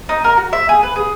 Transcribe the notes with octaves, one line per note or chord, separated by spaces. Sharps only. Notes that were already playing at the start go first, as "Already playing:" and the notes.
D#4
A#4
F#4
E5
G#4
B4
G#4